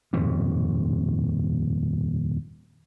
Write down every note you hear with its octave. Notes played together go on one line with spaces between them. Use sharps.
D#1 F2 G#2 B2